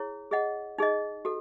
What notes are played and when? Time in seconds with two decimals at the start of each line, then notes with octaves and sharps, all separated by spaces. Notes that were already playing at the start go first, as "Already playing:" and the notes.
Already playing: E4 G#4 C#5
0.31 G#4 D#5 F#5
0.78 D#4 G#4 D#5
1.25 F#4 A4